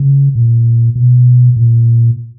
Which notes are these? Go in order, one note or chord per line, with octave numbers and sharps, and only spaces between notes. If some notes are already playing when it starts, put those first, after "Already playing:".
Already playing: C#3
A#2
B2
A#2